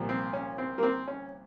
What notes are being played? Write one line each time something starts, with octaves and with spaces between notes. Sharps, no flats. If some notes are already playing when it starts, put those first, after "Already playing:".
Already playing: C2 A#2 F3
C4
C#4
C4
A#3
C4
C#4